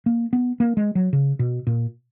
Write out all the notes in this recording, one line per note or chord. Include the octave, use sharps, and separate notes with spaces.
A#3
B3
A#3
G#3
F#3
C#3
B2
A#2